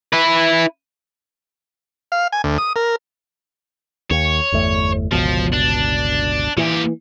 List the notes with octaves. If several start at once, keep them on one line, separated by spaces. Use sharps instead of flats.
E4 B4
F5
G#5
D2
D#6
A#4
D#2 C#5
G1 E2 A3
G1 C#2 B2 F3
D4
A#2 E3 G4